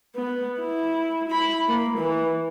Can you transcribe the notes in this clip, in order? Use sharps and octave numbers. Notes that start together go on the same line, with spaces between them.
B3
E4
E4 B5
A#3
E3